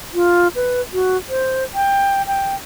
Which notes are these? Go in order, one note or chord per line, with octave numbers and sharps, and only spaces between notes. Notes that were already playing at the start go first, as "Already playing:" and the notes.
F4
B4
F#4
C5
G5
G5